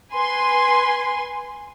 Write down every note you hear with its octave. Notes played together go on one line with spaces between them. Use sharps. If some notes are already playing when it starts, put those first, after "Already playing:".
B4 G#5 C6